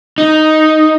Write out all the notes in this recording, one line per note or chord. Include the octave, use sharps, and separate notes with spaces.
D#4